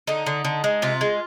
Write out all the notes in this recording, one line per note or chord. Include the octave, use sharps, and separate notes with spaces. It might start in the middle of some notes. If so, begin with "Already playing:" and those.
D3 D#4
D3
D3
G#3
C3 F4
G#3